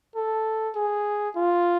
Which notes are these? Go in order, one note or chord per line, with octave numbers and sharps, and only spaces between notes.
A4
G#4
F4